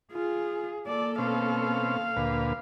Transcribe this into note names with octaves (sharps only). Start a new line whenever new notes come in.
F4 G#4
A#3 A4 D5
B2 C4 C#4 F5
D2 A#2 B4